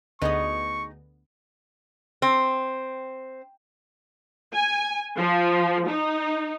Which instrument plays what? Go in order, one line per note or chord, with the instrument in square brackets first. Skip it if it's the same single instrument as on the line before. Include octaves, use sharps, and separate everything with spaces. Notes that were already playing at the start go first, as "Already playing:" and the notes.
[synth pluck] D2 D3 B3 [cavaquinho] D#4 D#6 [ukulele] G#4 D#5 [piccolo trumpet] C#6
[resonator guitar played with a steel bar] C4
[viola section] G#5
F3
D#4